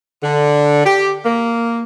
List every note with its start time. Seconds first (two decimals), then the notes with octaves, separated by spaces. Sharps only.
0.23 D3
0.86 G4
1.26 A#3